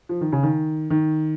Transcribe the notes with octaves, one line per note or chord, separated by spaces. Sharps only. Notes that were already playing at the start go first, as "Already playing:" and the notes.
F3
D#3
C#3
D#3
D#3